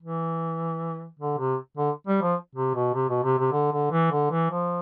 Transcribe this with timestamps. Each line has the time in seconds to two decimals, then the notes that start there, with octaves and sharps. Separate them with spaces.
0.02 E3
1.19 D3
1.38 C3
1.77 D3
2.07 G3
2.22 F3
2.55 C3
2.75 B2
2.94 C3
3.09 B2
3.24 C3
3.38 C3
3.52 D3
3.72 D3
3.91 E3
4.11 D3
4.31 E3
4.50 F3